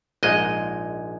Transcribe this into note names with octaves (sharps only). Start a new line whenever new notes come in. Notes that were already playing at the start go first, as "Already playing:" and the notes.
A#1 G#2 G#3 D#5